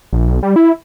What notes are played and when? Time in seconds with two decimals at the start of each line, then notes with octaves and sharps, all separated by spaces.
0.13 A#1
0.27 B1
0.43 G3
0.56 E4